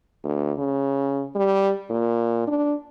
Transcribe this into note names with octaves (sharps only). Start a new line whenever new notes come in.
D2
C#3
G3
A#2
D4